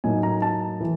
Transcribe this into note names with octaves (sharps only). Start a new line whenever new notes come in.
A2 F#3 A#3 D#4 G#5
A#5
A5
E3